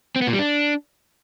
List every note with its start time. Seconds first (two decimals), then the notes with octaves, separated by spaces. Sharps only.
0.16 C4
0.22 B3
0.27 A#2
0.33 G3
0.39 D4